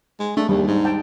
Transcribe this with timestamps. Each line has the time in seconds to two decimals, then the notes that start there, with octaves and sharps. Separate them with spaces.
0.20 G#3
0.37 A3 D4
0.49 D#2 G3
0.67 G#2
0.85 G5 A5